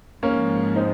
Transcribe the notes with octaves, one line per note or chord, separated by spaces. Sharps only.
G#2 F3 G#3 A#3 C#4
C4 D#4